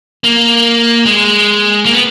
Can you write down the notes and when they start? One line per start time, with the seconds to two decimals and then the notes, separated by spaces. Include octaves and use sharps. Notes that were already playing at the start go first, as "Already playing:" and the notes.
0.24 A#3
1.06 G#3
1.86 A#3
1.94 B3